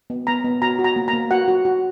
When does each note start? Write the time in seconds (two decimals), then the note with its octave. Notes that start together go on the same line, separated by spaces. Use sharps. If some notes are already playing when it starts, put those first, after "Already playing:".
0.10 B3
0.27 B3 A#5
0.44 B3
0.62 F#4 A#5
0.79 F#4
0.84 A#5
0.96 A#3
1.08 A#5
1.13 A#3
1.31 F#4 F#5
1.48 F#4
1.65 F#4